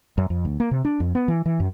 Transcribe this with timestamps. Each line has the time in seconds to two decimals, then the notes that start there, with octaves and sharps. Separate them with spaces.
0.18 F#2
0.30 F2
0.45 D2
0.60 A#3
0.71 C3
0.85 D4
1.00 F2
1.15 B3
1.28 E3
1.46 E3
1.60 F#2